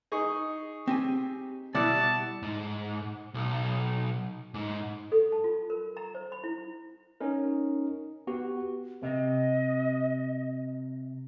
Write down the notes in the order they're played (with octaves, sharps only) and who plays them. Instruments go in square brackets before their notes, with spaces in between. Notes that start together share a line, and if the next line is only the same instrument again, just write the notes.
[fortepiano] D#4 G#4 C#6
[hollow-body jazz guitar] C4 G4 G#5
[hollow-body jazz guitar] B2 G3 [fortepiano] E4 D5 F#5 [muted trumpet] A5
[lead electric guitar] G#2
B1
G#2
[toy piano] A4
A5
F4
A#4
A#5
C5
B5
E4
[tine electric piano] C#4 D#4 A#4
B3 F#4 G4
[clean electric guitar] C3 [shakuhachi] D#5